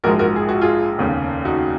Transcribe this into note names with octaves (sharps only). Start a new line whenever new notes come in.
A#1 G#2 F3 G#3 F#4 A#4
F#4 A#4
G#4
F#4
F4 G#4
F1 D#2 C#3
D#4 F#4